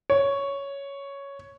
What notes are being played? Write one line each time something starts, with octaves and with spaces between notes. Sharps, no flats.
C#5